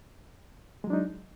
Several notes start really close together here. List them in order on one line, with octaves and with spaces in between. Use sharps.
G#3 F#3 D4 D#4